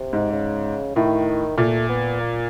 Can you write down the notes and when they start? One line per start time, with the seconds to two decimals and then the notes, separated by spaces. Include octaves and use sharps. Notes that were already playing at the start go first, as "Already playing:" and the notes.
Already playing: C3
0.13 G#2
0.33 C#3
0.95 A2 D#3
1.57 A#2 A3
1.89 B3
2.20 A#3